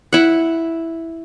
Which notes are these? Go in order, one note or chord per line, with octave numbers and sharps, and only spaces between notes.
E4 F#5